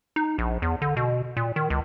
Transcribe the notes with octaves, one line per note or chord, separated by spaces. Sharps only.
D#4
A#1
E2
D3
B2
A#2
D#3
C#2